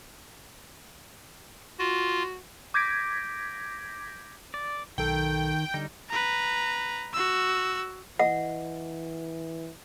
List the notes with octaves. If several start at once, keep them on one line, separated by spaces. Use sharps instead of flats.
F4 F#4
D6 G6 G#6 A#6 B6 D7
D5
B1 D#3 A4 G5
D3 G3 D#4
B4 A#5
F#4 E6
E3 D#5 F#5